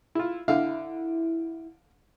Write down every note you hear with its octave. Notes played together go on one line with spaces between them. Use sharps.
E4 F4
D3 E4 F5